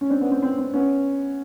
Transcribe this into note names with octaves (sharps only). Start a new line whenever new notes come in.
C#4
C4 D4
B3 C#4
C4
C4
C4
B3 C#4